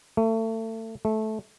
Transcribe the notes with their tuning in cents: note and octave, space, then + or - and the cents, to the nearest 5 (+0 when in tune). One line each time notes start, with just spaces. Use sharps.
A3 +30
A3 -15